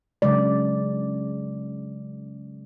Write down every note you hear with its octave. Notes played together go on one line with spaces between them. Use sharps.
C#3 F#3 G#3 D5